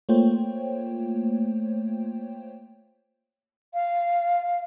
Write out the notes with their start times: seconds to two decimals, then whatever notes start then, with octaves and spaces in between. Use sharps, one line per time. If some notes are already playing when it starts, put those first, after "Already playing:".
0.09 A3 A#3 F4 C5 C#5 G5
3.74 F5